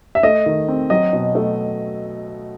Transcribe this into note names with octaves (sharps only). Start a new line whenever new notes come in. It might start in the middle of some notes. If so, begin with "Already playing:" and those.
E5
A3 D#5
D#3
C4
F#3 D#5
B2
A3